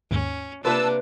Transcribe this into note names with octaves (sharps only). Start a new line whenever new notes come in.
D#2 G#2 C#4
C3 A#3 D4 F4 A#4 B4 A5 E6